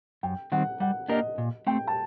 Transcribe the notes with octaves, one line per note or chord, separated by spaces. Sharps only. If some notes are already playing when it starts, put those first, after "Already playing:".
F#2 G5
D#3 G3 C4 F#5
G3 F#5
A#3 D4 G4 A#4 D#5
A#2
A3 C4 G5
A5